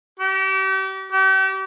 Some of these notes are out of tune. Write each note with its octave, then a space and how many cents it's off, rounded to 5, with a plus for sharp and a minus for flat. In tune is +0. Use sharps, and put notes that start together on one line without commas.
G4 -40
G4 -40